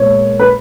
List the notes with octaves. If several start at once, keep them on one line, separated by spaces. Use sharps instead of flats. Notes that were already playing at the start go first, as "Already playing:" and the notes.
Already playing: A#2 G#3 B3 C#5
B4